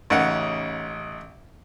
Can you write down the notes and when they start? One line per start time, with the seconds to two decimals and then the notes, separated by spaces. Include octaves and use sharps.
0.10 A1 C#3 D#4 F#5